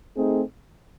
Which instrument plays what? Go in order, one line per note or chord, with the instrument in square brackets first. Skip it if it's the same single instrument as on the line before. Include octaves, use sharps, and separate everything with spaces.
[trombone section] A3 C4 D#4 G#4